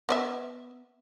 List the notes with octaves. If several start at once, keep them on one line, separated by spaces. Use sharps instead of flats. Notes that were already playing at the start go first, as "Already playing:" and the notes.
B3 D5 E5